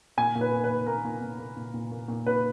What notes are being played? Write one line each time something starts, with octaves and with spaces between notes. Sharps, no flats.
A#2 G#5
A#2
B4
A#2
B4
A#3
A#3 A#4
A#2
A#2
A#3
A#2
A#2
A#3
A#2
A#3 B4